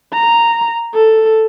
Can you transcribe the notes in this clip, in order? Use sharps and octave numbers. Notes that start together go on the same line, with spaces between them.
A#5
A4